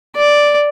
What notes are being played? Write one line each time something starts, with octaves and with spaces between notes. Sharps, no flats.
D5